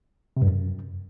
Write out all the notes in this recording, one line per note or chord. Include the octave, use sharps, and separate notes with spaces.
C3
G2
F#2